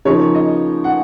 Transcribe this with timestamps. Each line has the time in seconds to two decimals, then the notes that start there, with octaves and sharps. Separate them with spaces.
0.05 C#3 F3 A#3 D#4 C#5
0.35 D#5
0.84 F#5